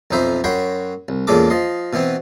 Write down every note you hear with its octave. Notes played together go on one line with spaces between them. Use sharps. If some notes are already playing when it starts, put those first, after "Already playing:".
B1 F2 D#4 C5 E5 B5
F#2 F#4 C#5 G5 B5 C6
C2
E2 A#2 G#3 C#4 A4 D6
F3 D#5 C6
B2 E3 B3 C4